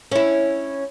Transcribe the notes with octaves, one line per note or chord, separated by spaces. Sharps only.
C#4 E4